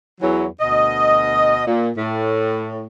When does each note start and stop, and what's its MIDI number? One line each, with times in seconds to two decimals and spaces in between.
0.21 0.46 40
0.21 0.46 52
0.21 0.46 54
0.61 1.63 38
0.61 1.63 47
0.61 1.63 75
1.67 1.89 46
1.97 2.86 45